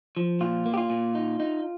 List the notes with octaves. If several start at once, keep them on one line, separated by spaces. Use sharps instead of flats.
F3
A#2 F4
A#3
G4
F4
A#2
D#4
D#4